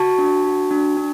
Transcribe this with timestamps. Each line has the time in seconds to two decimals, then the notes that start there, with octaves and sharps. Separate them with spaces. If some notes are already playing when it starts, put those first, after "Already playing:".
Already playing: F#4 A5 C#6
0.18 D4
0.45 F#4
0.71 D4
0.97 D4